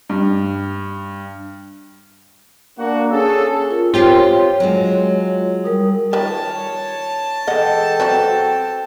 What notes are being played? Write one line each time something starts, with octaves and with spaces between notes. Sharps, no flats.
G2
A#3 D4 F#4
C#4 G#4 A4
F4 A#4
C4 F4 G4 C#5
F#3 G#3
G3 A#4 D#6
D#3 F3 B4 C#5 A5
E3 G#3 A4 D#5 F#5 G5
F#3 C4 F#4 B4